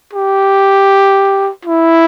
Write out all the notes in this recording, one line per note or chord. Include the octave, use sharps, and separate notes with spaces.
G4
E4